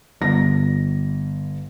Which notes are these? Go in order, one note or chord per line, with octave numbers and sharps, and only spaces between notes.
G1 A#6